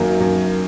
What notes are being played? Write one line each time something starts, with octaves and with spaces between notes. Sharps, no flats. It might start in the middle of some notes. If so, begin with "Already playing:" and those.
Already playing: F#2 D#3 F#3 A#3
F#2